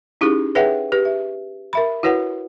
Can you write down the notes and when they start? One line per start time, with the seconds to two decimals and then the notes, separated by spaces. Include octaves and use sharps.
0.21 C#4 D#4 E4 G4 G#4
0.55 G#4 B4 C#5 E5 F#5 G5
0.92 G4 B4
1.05 E5
1.73 A#4 E5 B5
2.03 E4 F#4 B4 C#5 F#5